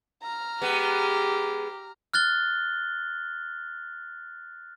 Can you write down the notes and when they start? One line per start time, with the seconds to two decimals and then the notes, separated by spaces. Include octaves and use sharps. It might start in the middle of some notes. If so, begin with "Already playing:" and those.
0.23 A#5 F6
0.61 G#3 B3 G4
2.13 F6 F#6 A6 G7